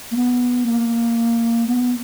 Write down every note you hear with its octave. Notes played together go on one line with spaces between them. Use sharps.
A#3
B3
A#3
B3